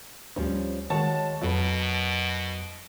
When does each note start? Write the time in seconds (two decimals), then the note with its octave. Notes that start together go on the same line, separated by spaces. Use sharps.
0.36 D2 F3 G3 C#4
0.90 D#3 G#3 F#4 C#5 A5
1.42 F2 B2 F#3 A#4 B4